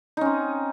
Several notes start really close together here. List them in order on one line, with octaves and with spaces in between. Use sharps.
D#4 C#4 C4